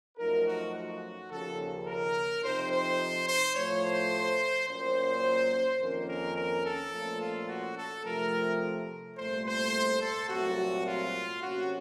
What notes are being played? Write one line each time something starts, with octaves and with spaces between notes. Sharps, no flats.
F#2 F3 A3 D#4 A#4
F#4
F#4
D#2 C#3 F3 A4
A#4
F2 C3 F3 C4 D#4 C5
C5
C5
A2 F3 A3 C#5
C5
A#2 F#3 A#3 C#4 C5
F2 D#3 A#3 C#4 A#4
A#4
A#4
A4
A#2 F3 A3 C#4
F4
F#4
A4
C3 F3 A3 A#4
C2 A#2 A3 C5
C5
A4
C2 A#2 F#3 A3 C4 F#4
F4
C3 F#3 A#3 C#4 F#4